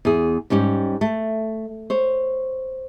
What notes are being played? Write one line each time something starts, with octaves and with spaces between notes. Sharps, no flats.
E2 G#4
G#2 G3 C#4 G4
A3
C5 C#5